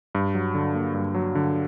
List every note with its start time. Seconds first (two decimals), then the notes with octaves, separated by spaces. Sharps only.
0.15 G2
0.35 F#3
0.55 D3
0.75 A#3
0.95 G2
1.15 F#3
1.35 D3